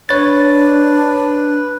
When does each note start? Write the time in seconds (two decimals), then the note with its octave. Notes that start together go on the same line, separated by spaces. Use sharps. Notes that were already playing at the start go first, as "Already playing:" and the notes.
0.09 D4 B4 C#5 A6